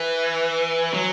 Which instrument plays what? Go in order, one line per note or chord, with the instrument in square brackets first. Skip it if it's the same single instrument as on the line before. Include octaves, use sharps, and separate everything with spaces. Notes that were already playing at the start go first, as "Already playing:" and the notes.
Already playing: [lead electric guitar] E3
F#3